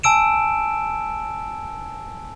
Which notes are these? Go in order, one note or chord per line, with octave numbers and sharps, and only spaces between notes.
G#5 A5 E6 D7 E7